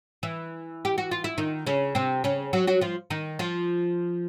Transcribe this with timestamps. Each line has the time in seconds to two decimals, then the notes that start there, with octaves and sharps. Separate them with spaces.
0.23 E3 E4
0.85 G4
0.98 F#4
1.11 F4
1.24 E4
1.38 D#3 D#4
1.67 C#3 C#4
1.95 C3 C4
2.24 C#3 C#4
2.53 F#3 F#4
2.67 F#3 F#4
2.81 F3 F4
3.10 D#3 D#4
3.39 F3 F4